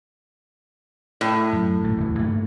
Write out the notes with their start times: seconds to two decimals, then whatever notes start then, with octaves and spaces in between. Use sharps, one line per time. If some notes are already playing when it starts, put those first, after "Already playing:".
1.21 A2
1.53 F#2
1.83 A#1 G2 A3
1.97 D1 E2
2.19 G2 A3 A#3